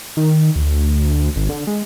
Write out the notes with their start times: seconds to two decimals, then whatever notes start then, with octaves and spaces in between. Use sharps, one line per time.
0.17 D#3
0.56 D2
1.36 G#1
1.49 D3
1.67 G#3